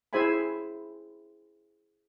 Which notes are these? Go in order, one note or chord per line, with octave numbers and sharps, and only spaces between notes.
E4 G#4 C5 E5 G#5 B5